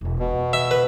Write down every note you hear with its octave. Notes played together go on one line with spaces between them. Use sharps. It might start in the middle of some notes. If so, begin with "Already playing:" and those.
E1 E2
B2
C4
E5
B4